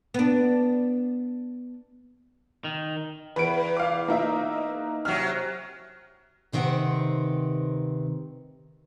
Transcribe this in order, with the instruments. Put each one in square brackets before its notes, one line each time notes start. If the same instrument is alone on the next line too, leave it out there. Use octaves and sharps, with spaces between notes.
[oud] B3 D4
[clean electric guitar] D#3
[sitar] E2 [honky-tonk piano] B4 D7
[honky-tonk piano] F5 D6
A#3 D#4 E5
[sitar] C3 F#3 [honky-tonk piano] F6
[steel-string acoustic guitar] D2 C3 D#3 C4 B4 F#5